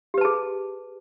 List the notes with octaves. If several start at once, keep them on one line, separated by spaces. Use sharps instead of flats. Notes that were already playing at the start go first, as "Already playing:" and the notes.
G4 G#4 B4 A5